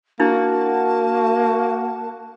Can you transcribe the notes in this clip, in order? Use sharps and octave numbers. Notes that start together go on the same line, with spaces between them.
A#3 D4 E4 F#4 A5